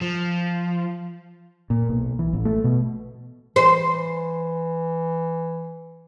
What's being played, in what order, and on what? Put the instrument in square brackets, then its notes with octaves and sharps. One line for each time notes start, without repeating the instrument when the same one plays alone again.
[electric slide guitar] F3
[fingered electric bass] A#2
B1
E3
A1
A3
B2
[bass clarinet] E3 [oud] C5